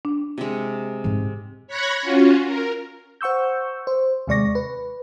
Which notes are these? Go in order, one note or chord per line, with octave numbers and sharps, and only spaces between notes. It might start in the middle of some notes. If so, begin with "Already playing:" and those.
D4
C3 G#3
G#2 C4
C#5 B5 F#6 G#6 A#6 C#7
C#4 F4 F#4
A#4
C5 F#5 C#6 E6 G6
C5
D#2 C3 G#3 D5 C#6 A#6
B4